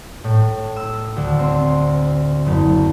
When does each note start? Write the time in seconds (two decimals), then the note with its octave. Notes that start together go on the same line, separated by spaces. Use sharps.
0.24 A2
0.76 E6
1.17 D2
1.39 C4
2.46 F#1